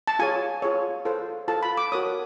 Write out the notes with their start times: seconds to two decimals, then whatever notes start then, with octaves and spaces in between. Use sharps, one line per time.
0.07 A5
0.19 F4 G#4 C#5 G#5
0.62 F4 G#4 C#5
1.05 F4 A4 C5
1.48 F4 A4 C5 A5
1.63 B5
1.77 D6
1.92 F#4 A#4 C#5 D#6